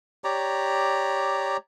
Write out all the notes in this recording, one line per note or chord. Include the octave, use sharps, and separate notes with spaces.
G4 C#5 D5 A#5